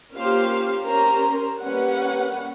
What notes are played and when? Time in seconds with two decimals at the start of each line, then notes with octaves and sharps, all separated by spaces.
0.14 A#3 C#4 F4 G4 C5 F5
0.84 C#4 G4 A#4 C5 A#5
1.63 G3 A#3 C#4 B4 F#5